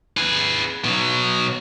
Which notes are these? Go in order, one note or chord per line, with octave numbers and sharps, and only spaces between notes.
G#4 B4
B2 F#3